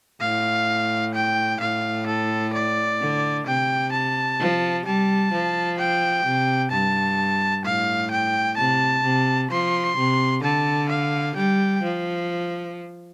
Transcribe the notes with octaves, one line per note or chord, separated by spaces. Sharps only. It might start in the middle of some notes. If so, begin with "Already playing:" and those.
A2 F5
G5
A2 F5
A4
D5
D3
C3 G5
A5
F3
G3 A5
F3
G5
C3
G2 A5
A2 F5
G5
C3 A5
C3
F3 C6
C3
D3 A5
F5
G3 G5
F3